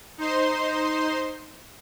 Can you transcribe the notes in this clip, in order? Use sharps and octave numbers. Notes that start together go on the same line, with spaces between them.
D#4 C5 C6